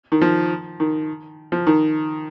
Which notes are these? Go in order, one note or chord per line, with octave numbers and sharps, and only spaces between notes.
D#3
F3
D#3
F3
D#3